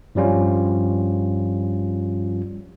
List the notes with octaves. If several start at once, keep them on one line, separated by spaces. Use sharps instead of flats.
G2 F3 G3 C#4 F4